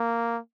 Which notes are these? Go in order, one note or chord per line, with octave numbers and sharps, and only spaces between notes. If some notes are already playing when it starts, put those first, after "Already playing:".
Already playing: A#3